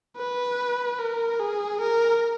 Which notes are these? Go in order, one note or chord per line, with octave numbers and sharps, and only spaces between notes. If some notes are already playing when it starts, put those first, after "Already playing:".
B4
A#4
G#4
A#4